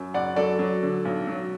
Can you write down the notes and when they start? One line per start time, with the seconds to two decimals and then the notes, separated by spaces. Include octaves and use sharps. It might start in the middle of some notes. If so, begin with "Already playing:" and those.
Already playing: F#2
0.14 F#1 D5 F#5
0.36 F#3 A4 D5
0.59 F#3
0.83 D3
1.05 B1
1.27 F#3